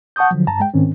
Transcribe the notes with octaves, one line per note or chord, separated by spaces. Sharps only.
F#5 A5 C#6 D#6 G6
D3 F3 F#3
G2 A5 A#5
G#3 G5
G#2 D#3 C4 C#4